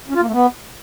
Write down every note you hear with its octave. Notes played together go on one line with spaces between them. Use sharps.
C#4
F4
A#3
A3
B3